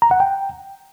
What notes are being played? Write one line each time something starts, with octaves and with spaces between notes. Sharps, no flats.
A#5
F#5
G5